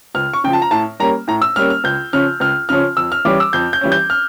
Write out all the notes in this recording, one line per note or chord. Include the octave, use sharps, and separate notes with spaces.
C#2 F6
C#6
C#3 F3 G5
A5
A#5
A2 A5
G3 A#3 C#4 A#5
A2 A#5
E6
G3 A#3 C#4 F6
F6
C#2 G6
C#3 F3 C#4 F6
C#2 F6
C#3 F3 C#4 F6
F2 E6
F6
E3 G3 C#4 D6
E6
F2 G6
G6
E3 G3 C#4
G6
F6